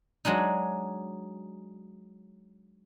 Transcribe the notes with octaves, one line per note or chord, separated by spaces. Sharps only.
F#3 G#3 D4 D#4